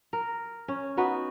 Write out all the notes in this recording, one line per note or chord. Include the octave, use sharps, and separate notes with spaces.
A#4
C#4
B3 D#4 F#4 B4